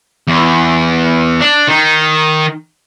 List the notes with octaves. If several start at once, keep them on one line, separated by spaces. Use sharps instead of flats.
E2
D4
D#3